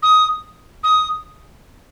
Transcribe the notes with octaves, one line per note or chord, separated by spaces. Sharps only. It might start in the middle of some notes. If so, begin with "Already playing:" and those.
D#6
D#6